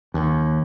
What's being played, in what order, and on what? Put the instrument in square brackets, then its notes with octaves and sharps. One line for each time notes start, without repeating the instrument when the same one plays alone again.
[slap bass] D#2